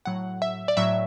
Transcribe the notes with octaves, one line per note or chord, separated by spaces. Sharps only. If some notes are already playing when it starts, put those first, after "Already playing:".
A2 F#3 F#5
E5
D5
A2 F#3 E5